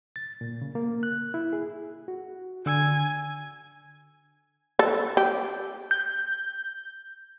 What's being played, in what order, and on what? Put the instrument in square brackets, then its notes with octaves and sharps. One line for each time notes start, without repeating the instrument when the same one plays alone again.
[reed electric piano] A6
A#2
C#3
A#3
F#6
E4
G#4
F#4
[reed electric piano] D3 E6 [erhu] G#5
[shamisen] A4
G4
[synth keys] G6